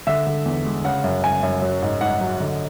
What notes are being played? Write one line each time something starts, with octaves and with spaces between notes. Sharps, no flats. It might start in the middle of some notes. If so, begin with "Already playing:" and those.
D3 E5
D3
E2
G#3
C#3 F#5
F#2
C#3 G#5
F#2
F#3
G#2
G#2 F#5
F#3
D3